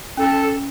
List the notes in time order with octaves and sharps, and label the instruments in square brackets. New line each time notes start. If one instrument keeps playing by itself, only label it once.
[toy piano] C#4 [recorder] A4